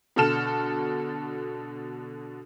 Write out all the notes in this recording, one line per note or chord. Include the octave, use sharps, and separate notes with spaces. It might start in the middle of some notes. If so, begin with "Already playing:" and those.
B2 D3 F#4 A4 F6 E7